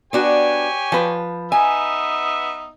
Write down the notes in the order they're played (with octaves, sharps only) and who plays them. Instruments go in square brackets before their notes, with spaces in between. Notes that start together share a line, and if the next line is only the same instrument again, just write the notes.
[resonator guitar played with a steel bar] B3 D4 F#4 [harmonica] G4 C#5 G#5
[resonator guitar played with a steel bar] F3 B4
[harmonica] B3 D#4 E5 [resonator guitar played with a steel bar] G#5